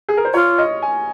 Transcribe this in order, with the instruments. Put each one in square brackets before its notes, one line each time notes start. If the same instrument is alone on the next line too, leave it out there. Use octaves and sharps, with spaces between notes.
[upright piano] G#4
A#4
C5
[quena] F4 [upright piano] C#5
[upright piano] D#5
G#5